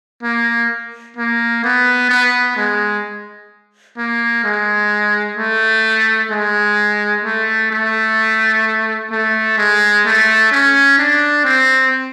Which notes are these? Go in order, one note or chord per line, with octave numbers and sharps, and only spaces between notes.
A#3
A#3
B3
B3
G#3
A#3
G#3
A3
G#3
A3
A3
A3
G#3
A3
C#4
D4
C4